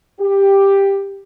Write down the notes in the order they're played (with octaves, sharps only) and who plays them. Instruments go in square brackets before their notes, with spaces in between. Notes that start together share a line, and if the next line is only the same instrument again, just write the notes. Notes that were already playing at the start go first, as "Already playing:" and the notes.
[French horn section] G4